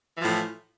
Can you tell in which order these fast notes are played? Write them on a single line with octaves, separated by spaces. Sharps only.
E3 F3 A2